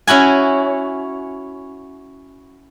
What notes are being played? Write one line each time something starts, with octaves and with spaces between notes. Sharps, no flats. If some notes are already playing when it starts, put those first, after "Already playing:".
C#4 E4 F#4 G#5